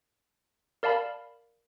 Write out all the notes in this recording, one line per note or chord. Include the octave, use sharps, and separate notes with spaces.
A#4 D5 F5 A5 B5